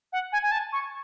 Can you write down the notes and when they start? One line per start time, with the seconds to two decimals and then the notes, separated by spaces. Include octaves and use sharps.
0.13 F#5
0.32 G#5
0.42 G#5
0.52 A5
0.73 C#6